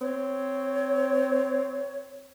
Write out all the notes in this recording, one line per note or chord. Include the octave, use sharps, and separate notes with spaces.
C4 C#5